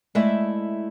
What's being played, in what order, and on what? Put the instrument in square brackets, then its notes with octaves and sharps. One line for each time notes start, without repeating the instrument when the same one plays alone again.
[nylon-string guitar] G#3 A3 E4 D5 E5